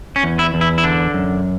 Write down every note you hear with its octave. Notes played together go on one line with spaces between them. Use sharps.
C#4
E2
E4
E2
E4
E4
D3 D4
F#2